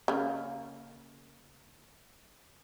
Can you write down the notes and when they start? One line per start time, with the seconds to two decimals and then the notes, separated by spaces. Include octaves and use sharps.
0.08 C#3 A#3